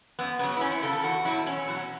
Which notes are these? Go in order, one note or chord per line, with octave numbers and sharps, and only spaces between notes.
F#2 B3
C#3 F#3 B3
E4
F#2 C#4
E4
C#3 F#3 A4
A4
E2 F#4
B2 F#3 E4
E2 C#4
B2 F#3